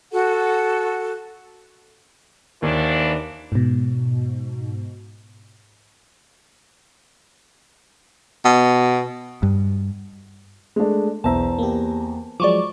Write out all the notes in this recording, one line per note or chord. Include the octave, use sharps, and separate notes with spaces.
F#4 A4 F#5
D#2 E3 F3 D4
G#2 B2
B2
G2
G#3 A3 D4
B1 E2 C5 E5 A5 A#5
A#3 G4
F3 F#3 G#3 D5 C#6 D6